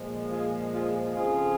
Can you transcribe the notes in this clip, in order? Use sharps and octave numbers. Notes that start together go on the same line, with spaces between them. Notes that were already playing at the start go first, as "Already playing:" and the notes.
Already playing: A#2 F3 G#3
F4 G#4
F4 G#4
F2 C#3 F3 F4 G#4